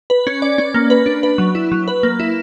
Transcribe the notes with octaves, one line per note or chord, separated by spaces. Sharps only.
B4
C#4
D5
C#4
A#3
B4
D4
B4
F#3
E4
F#3
B4
A#3
E4